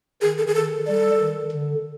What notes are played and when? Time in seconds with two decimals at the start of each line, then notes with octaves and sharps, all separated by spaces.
0.21 D#3 G#4
0.38 A4
0.47 G#4
0.55 D#3 A4
0.87 G3 A4
1.20 D#3
1.52 D3